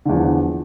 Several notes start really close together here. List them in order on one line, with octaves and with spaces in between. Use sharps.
D3 E2 F3 E3